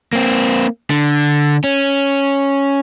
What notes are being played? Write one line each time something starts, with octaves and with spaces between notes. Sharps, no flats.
A#3 C4
D3
C#4